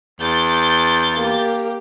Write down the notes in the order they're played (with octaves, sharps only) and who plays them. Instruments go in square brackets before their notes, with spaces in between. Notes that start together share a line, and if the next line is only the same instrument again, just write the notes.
[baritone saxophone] E2 [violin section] G6 A6
[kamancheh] A#3 G4